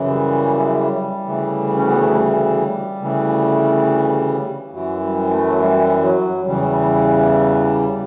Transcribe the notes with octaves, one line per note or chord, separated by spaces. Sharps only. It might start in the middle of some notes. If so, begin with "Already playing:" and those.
Already playing: F#2 C#3 E3
G3
D2 C#3 E3
C#4
B3
A3
G3
D2 C#3 E3
F#2 E3 F#3
G3
A3
F#3
G3
F#3
E2 C#3 E3 G3